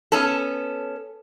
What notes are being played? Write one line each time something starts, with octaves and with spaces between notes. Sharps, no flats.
B3 C#4 A4